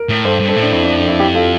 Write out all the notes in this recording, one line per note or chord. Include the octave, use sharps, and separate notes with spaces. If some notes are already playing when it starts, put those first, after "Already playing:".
Already playing: A#4
A2
G2 A4 C5
G2
A4 C5
A2
D4
F2 E4
D4
D4
E4
E4 G4
F4 A4